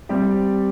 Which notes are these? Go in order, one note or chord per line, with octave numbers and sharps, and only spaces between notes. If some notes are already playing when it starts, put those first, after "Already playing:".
G3 C4 G4 D5